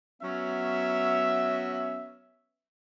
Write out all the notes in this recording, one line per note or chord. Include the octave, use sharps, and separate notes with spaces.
F#3 B3 C#4 E5